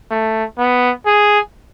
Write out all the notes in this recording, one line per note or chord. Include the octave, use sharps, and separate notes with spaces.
A3
B3
G#4